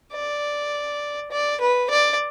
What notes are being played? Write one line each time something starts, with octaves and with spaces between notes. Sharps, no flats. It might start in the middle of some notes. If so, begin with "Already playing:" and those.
D5
D5
B4
D5